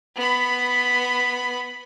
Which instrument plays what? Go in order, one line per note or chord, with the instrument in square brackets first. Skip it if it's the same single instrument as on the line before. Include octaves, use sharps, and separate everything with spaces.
[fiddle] B3 B5